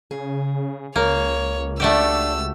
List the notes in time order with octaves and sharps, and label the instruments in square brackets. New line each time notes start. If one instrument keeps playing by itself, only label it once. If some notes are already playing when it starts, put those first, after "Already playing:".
[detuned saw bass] C#3 [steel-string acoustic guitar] G#4
[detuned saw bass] C#2 [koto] A#3 [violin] C#5
[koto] A3 F#4 G4 [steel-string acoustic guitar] D4 D5 E5 [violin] E6